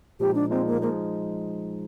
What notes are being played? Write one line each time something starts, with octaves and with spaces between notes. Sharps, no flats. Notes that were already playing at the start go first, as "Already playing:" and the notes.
A#2 F3 G#3 D#4 G4
D4
A#2 F3 G#3 C4 D#4
A#3
F3 G#3 A#3 D#4